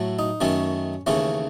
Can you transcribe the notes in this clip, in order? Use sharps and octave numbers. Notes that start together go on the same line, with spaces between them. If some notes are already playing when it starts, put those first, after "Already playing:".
Already playing: A2 F#3 A3
D#4
F#2 D#3 A3 C#4
D#2 C#3 E3 A3 C#4